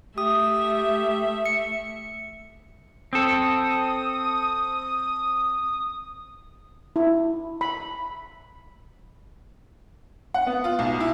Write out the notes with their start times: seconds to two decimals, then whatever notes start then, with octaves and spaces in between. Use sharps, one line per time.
0.18 A3 G4 E5 D#6
1.46 C#7
3.13 C4 A4 D#6
6.96 E4
7.61 B5
10.34 F#5
10.47 B3
10.64 F4
10.79 B1
11.00 E4